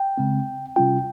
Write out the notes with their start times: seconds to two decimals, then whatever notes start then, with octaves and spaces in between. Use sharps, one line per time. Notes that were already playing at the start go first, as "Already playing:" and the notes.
Already playing: G5
0.18 C#3 G#3 C4
0.76 C3 G3 C#4 F4 G5